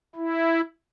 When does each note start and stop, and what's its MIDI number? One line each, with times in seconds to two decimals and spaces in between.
0.16 0.61 64